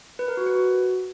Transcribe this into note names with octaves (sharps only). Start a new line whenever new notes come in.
B4
A#4
F#4
B4
F#4